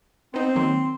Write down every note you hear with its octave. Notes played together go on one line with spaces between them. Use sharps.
B3 C4 D#4 C5
D#3 F#3 A#3 C6